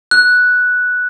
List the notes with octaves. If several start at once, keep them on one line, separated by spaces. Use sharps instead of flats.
F#6